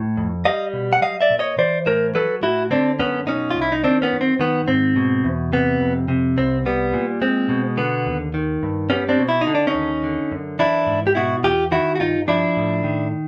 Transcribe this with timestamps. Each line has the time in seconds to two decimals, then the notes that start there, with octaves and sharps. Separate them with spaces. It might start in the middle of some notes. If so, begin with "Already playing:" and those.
Already playing: A2
0.17 F2
0.45 G3 D#5 F5
0.74 B2
0.93 F#5
1.02 F#3 D#5 F5
1.21 D5 E5
1.31 A#2
1.39 C#5 D#5
1.58 E3 C5 D5
1.86 A2 A#4 C5
2.15 F#3 A4 B4
2.43 A2 E4 F#4
2.71 D3 C4 D4
3.00 F#2 B3 C#4
3.27 B2 C#4 D#4
3.50 F4
3.56 C2
3.62 E4
3.72 D#4
3.84 D#3 C4 D4
4.02 B3 C#4
4.12 F#2
4.21 C4
4.39 D#3 B3
4.68 G#2 C4
4.96 B2
5.24 E2
5.53 C3 B3
5.80 F2
6.08 C3
6.37 C2 C4
6.66 G3 B3
6.94 A#2
7.22 G#3 C4
7.49 B2
7.77 D3 B3
8.07 D#2
8.34 D#3
8.63 G2
8.90 G3 B3 C#4
9.09 C4 D4
9.19 B2
9.29 E4
9.41 D#4
9.47 D3
9.55 D4
9.67 C#4 D#4
9.75 D#2
10.04 D3
10.32 F#2
10.59 E3 D4 E4
10.87 G#2
11.07 G4
11.15 B2 E4 F#4
11.44 E2 F4 G4
11.71 D#3 E4 F#4
11.95 F#4
12.00 G2 D#4 F4
12.28 F3 D4 E4
12.57 A2
12.84 D#3